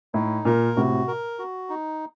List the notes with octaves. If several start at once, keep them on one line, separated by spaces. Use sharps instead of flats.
A2 D#4
A#2 A#4
A2 C3 F#4
A#4
F#4
D#4